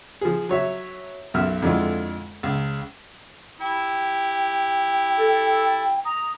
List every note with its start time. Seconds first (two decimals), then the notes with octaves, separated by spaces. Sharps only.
0.21 F3 G#4
0.49 F#3 C#5 E5
1.34 B1 F#2 E5 F6
1.62 F2 D3 G#3 E4 F4
2.43 C#2
3.61 E4 G4 G5
5.19 A4
6.05 A#5 D#6